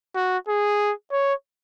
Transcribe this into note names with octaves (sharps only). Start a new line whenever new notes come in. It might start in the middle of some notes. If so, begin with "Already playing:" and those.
F#4
G#4
C#5